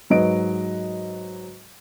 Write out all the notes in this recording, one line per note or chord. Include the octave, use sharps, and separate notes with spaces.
G#2 F#3 B4 D#5 D7